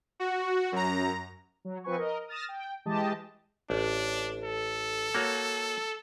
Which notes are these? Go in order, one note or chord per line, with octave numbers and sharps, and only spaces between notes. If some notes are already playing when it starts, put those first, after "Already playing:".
F#4
F#2 A#5
F#3
F3 C4 B4 G#5 C#6
A#4 D#5
D#6 F6 A6 A#6 E7
G5
E3 G#3 G4 D#5 A5
A1 D4
A4
A#3 F#4 C#5